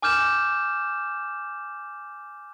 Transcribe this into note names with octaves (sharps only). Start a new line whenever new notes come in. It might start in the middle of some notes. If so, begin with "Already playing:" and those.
G#5 D6 F6 G6 E7